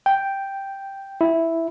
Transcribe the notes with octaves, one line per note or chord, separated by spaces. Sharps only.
G5
E4